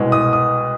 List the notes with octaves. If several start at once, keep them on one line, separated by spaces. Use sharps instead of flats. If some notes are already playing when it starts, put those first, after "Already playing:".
Already playing: C2 B2 G#3
D#6
D#6